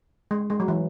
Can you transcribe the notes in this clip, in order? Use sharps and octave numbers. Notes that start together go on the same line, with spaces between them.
G#3
G#3
F#3
E3